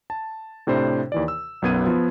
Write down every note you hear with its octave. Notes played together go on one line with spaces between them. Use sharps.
A5
A2 C3 D4 C5 B5
D#2 E3 D5
E6
B1 F#2 B3 G#6 D#7
F3 B3